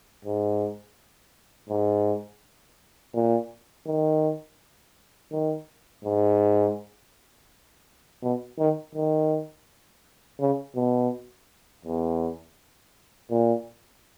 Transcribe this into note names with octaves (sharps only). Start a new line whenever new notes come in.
G#2
G#2
A#2
D#3
D#3
G#2
B2
D#3
D#3
C#3
B2
E2
A#2